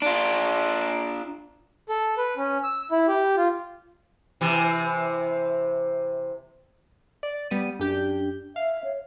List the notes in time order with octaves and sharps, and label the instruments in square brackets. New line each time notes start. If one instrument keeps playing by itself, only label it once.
[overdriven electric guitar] D4 F4
[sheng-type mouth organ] A4
B4
C#4
E6
E4
G4
F4
[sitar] C3 E3
[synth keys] D5
G3 B3 D#7
[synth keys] F#2 G4 G6 [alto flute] D4
[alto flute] E5 [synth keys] F5
[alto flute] C#5